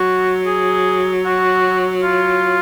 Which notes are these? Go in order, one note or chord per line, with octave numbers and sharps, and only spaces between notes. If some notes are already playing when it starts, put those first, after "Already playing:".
Already playing: F#3 F#4
G#4
F#4
F4